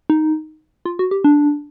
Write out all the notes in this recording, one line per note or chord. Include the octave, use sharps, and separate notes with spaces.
D#4
F4
F#4
G4
D4